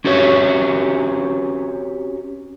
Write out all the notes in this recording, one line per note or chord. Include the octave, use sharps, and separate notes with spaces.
C4 C#4 F#4 G4 C#5